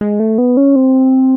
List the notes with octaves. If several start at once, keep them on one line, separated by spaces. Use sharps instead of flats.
G#3
A3
B3
C#4
C4